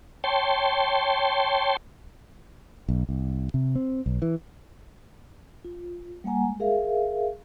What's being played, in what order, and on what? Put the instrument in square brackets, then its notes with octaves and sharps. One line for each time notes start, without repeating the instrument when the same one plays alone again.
[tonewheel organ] C#5 G5 A5 C6
[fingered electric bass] B1
C2
C3
C4
B1
E3
[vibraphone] F4
G3 A#3 F#5 G#5 A#5
G#3
G#4 A#4 E5 F5